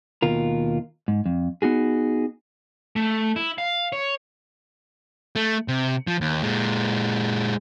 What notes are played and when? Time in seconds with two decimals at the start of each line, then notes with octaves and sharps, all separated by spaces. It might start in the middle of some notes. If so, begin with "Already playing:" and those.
0.22 D#2 B2 F4 A#4
1.08 G#2
1.26 F2
1.62 B3 D#4 F#4 G#4
2.96 A3
3.36 E4
3.58 F5
3.92 C#5
5.36 A3
5.68 C3
6.07 F3
6.21 D#2
6.43 A#2 G#3